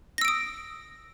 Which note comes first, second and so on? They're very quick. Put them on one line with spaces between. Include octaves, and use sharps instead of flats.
A#6 E6 D7 D#6